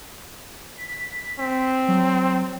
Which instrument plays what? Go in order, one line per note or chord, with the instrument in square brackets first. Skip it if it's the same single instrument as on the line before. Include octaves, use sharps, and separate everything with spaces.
[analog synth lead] B6
[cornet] C4
[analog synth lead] F#3